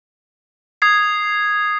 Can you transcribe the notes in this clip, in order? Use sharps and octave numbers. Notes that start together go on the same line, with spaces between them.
D#6 G#6 C7